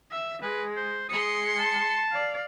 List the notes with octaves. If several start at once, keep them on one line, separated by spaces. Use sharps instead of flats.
E5
G#3 B4
C5
G#3 C6 D#6 C#7
A5
D5 F5